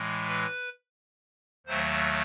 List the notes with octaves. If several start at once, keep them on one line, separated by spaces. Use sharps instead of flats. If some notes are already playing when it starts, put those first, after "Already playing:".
Already playing: A2 E3 G#3
B4
D#2 D#3 F#3 A3 C5